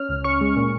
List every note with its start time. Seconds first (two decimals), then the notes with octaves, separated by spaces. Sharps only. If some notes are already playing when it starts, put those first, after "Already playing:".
Already playing: C#4 F6
0.09 C#2
0.24 C#4 C#6
0.41 G#3
0.56 A#2